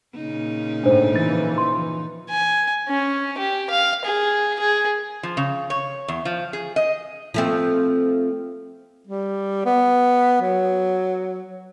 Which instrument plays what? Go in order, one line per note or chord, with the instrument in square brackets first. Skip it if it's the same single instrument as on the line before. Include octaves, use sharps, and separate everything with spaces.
[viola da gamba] A#2 C#3 D#4
[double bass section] A2 [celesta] D4 C5
[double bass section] E3 F3 [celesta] A6
[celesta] C6
[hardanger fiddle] G#5
C#4
G4
F5
G#4
G#4
[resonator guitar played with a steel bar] F3
C#3
C#5
E2
F3
G#4
D#5
[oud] F3 A3 C4
[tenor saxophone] G3
B3
F#3